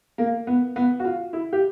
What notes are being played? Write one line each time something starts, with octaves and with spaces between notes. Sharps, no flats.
A#3
B3
B3
F#4
F4
E4
G4